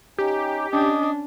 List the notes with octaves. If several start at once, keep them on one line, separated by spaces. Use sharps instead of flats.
C#4 D#4 G4
C#4 D4 D#5 D6 D#6